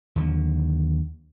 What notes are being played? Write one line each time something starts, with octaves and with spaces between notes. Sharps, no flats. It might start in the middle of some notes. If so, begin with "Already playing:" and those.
D#2 D3 F3 F#3